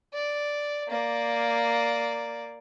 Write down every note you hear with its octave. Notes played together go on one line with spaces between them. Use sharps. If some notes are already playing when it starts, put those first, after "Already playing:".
D5
A#3 D5